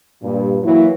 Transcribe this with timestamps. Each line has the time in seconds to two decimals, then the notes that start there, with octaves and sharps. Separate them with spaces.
0.23 G2 A#2
0.64 E3 F#3 A#3 E4